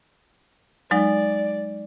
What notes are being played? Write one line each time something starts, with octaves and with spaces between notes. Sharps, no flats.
F#3 G#3 D#4 D5